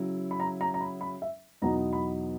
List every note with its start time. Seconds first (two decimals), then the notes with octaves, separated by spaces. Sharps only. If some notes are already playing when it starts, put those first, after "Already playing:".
Already playing: C#3 F#3 E4
0.31 B5
0.40 A#5
0.61 A#5
0.74 A#5
0.81 B5
1.01 B5
1.22 E5
1.62 E2 B2 F#3 B3 D#4 A#5
1.93 B5